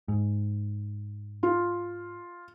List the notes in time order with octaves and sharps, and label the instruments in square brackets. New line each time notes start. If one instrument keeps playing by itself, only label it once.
[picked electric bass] G#2
[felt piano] F4